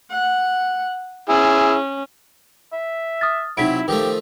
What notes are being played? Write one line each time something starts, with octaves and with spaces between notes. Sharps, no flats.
F#5
C#4 E4 G#4
E5
D#6 F6 A6
C3 F#3 D#4 E4 B6 D7
D#3 F3 A3 G4